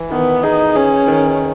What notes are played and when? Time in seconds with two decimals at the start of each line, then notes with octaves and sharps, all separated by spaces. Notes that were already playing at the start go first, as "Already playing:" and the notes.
Already playing: E3
0.11 D#3 B3
0.43 D#4 G#4
0.75 C#4 G#4
1.07 D#3